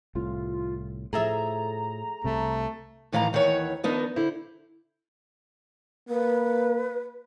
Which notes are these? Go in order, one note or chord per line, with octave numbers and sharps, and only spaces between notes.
C2 A2 F4
A2 F3 G#4 A4 E5 A#5
C2 C3 A3
A2 D#3 E3 F5 F#5 A#5
D#2 D#3 E3 D#4 C#5 F#5
D#3 F3 B3 D4 D#4 A#4
D3 E4 C5
A#3 B4